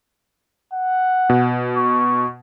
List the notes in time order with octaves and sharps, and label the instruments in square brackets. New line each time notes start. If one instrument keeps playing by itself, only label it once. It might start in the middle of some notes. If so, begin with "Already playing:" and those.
[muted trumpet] F#5
[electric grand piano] B2
[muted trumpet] C#6